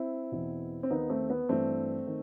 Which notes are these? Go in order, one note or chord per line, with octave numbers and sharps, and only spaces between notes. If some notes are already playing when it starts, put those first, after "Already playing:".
Already playing: C4 E4
E2 B2
C4
D#2 D#3 B3 D#4
A3 C4
B3
G2 E3 A3 C4
D#3